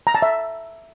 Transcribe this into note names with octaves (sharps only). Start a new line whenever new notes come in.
A#5
A5
E5